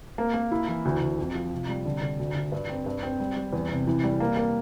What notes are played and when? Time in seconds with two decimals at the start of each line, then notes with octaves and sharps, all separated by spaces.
0.18 A#3
0.34 A#3
0.51 E4
0.68 E3
0.85 D2
1.01 D2
1.19 F2
1.35 F3
1.52 C3
1.69 G3
1.85 D3
2.02 D3
2.19 D2
2.35 D2
2.52 G2
2.69 C4
2.86 G2
3.03 C4
3.20 G3
3.36 G3
3.53 E2
3.71 C3
3.87 E3
4.04 G3
4.20 A#3
4.37 A#3